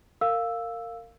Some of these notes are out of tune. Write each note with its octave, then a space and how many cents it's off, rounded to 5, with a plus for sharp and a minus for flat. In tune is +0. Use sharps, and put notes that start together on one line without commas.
A#4 -30 F5 +0 E6 +0